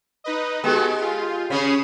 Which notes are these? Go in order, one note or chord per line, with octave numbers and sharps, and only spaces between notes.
D#4 B4 D#5
G#3 B3 F#4 G4 A4
F4
C#3 C#4 B5 D#6 C7